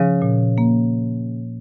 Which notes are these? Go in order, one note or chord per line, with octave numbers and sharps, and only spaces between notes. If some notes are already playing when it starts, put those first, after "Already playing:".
Already playing: C#3 F3
A#2
A#3